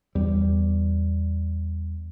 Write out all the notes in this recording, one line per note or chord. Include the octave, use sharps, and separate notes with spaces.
E2 G3